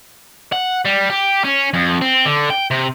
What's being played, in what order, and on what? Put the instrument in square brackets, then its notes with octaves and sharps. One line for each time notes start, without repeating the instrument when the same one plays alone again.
[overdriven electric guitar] F#5
G3
G4
C#4
F2
C4
D3
G5
C3